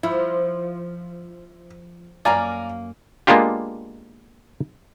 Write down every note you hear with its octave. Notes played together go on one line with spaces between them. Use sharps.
F3 E4
F#2 A#3 D5 F5 G#5 A#5
G#3 A#3 B3 D4 F4 G4